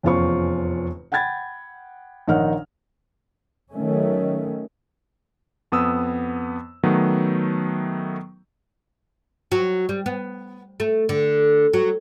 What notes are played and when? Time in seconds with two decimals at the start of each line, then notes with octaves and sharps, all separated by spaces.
0.03 F1 E2 C#4 F4 C5 C#6
1.12 F#5 G5 B5 G#6 A6
2.28 A#1 D#3 D#4 C#5 F#5 F6
3.72 D#3 F#3 A3 C#4
5.72 F2 B3 D#6 E6
6.83 D#3 F#3 A3 B3
9.52 F#3
9.89 G3
10.06 B3
10.80 A3
11.09 D3
11.74 F#3